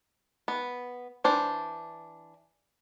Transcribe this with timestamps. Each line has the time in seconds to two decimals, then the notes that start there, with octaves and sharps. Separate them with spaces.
0.48 B3
1.24 E3 D4 C5